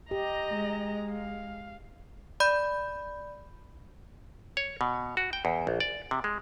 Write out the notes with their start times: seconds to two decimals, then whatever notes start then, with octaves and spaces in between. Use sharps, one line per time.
0.11 G4 D#5 A#5
0.51 G#3
1.11 F5
2.40 D5 B5 G6
4.57 C#5
4.81 B2
5.17 F#4
5.33 G5
5.45 E2
5.67 A#1
5.80 D5
6.11 C3
6.24 G#3